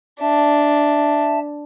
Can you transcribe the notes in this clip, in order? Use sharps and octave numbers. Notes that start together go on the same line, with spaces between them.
D4 E5 A5